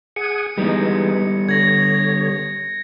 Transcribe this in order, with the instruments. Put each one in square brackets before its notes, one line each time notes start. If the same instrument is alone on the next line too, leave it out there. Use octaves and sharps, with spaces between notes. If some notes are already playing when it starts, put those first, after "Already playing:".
[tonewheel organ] G#4 F#5 G#5 [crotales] C#7
[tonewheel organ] E3 G#3 D#4 [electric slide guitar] G3 B3
[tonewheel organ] D3 C#5 [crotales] G#6 A#6